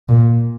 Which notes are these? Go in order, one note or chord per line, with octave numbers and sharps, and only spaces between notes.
A#2